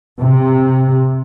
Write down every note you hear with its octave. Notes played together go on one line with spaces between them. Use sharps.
C3